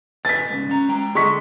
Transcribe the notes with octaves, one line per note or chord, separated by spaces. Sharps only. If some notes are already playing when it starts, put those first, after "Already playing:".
B2 B4 G#5 A6 B6
G#2 C#3
C#4 A#5
G#3 G5 A#5
D3 G#3 A4 C#6 B6